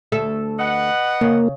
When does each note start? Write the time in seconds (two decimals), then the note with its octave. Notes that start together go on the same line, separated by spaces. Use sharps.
0.12 D2 A4 E5
0.59 B4 D#5 F#5
1.21 C#3 A#3